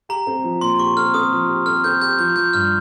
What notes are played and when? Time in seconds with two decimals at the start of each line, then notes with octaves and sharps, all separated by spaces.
0.09 G4 A#5
0.27 C4
0.44 F3
0.61 A#2 C6
0.79 G4 C#6
0.97 C4 F6
1.14 C4 D#6
1.32 F3
1.49 G4
1.66 C4 F6
1.84 C4 G6
2.01 G4 G6
2.19 F3 G6
2.36 F3 G6
2.53 G2 F6